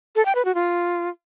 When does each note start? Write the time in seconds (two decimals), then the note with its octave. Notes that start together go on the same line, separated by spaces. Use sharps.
0.16 A4
0.25 G5
0.35 B4
0.45 F#4
0.55 F4